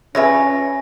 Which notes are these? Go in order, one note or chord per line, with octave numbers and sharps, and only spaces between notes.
C#3 C#4 F4 B4 C#5 E5 G#5 A#6